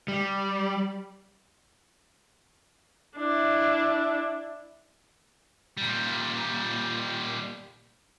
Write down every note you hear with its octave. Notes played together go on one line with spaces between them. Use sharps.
G3
D4 E4
A#2 G3